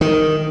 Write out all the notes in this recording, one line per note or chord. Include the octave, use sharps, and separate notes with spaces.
D#3